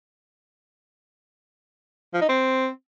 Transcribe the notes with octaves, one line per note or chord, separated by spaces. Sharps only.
F3
D#4
C4